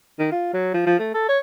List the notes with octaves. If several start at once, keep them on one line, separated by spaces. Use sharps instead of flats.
D#3
F4
F#3
F3
F3
A3
A4
C#5